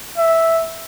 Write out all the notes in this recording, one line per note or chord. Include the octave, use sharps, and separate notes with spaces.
E5